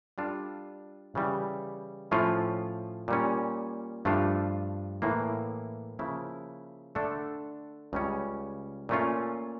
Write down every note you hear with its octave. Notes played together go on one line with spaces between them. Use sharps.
G3 D4 F4 A4
C#3 E3 G3
A2 F3 A3 C#4 F4
A#2 G3 C#4
G2 F3 A3 D4 F4
A2 E3 A#3
C#3 F3 A#3 E4
D3 A3 D4 A4
C#2 C#3 G3 C#4
A#2 A3 C#4 F4